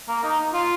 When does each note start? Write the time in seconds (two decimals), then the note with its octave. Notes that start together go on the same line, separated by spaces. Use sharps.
0.08 A#3
0.23 D#4
0.53 F4